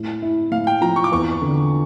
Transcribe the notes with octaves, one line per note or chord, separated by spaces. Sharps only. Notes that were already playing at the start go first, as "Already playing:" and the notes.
Already playing: A2
E4
A2 F5
G5
F3 A#5
C#6
D6
E2 C#6
D3